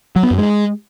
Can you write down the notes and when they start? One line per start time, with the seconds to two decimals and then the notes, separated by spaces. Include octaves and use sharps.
0.16 F#3
0.23 B3
0.31 F#2
0.38 G#3